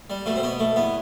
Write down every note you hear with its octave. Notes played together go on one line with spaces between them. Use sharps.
G3
B2 A3
C4
B2 B3
A3
E2 B3